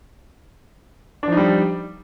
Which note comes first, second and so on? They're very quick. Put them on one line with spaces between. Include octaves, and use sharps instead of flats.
D4 F3 D#4 G3